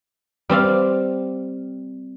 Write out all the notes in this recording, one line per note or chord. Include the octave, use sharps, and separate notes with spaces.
G3 C4 D5 F5